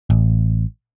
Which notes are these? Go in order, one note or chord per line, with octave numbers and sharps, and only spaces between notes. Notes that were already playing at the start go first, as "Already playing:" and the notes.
A1